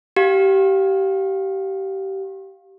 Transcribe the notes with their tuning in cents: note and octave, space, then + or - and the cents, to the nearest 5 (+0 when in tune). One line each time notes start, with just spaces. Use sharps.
G4 -20 F5 +10